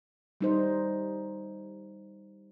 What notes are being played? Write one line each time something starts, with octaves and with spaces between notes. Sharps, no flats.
G3 D#4 C5